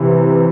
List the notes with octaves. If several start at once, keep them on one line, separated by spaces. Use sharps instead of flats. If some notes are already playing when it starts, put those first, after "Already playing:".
Already playing: C3 E3